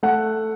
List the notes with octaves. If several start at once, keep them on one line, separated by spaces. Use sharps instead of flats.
A3 F#5